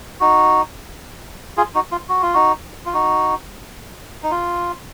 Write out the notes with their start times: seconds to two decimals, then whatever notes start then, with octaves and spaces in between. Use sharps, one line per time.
0.20 D#4 F#4
1.57 F4 G#4
1.75 D#4 F#4
1.92 F4
2.09 F#4
2.22 F4
2.34 D#4 F#4
2.86 F4
2.94 D#4 F#4
4.23 D#4
4.31 F4